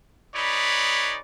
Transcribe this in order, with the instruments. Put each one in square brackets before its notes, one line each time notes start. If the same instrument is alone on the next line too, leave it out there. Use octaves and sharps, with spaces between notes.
[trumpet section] D#4 G#4 B4 C#5 D5 B5